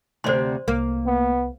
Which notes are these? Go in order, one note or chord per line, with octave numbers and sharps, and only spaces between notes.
D2 C3 C5 D5 C6
C2 A#3
B3